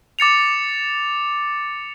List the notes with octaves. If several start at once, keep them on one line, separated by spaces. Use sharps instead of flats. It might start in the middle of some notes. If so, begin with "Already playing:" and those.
D6 A6 C#7 F7